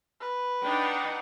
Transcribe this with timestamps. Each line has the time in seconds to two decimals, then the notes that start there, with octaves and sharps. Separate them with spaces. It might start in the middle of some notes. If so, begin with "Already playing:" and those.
0.21 B4
0.64 D4 D#4 F#5 G5